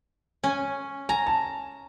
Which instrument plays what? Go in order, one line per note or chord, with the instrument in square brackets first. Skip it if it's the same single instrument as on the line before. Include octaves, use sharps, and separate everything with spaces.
[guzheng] C#4 G#5
[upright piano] G#5 [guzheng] A#5
[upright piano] A5